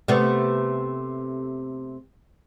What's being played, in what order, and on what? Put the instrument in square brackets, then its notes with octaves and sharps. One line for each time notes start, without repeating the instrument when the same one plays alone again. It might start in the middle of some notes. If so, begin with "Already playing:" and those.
[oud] C3 A3 B3